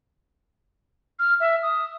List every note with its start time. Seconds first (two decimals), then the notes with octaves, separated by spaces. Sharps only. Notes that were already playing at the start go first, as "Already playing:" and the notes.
1.19 F6
1.40 E5
1.63 D#6